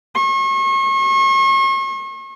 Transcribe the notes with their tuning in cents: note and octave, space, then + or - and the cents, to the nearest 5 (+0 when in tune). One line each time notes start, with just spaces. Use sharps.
C#6 -40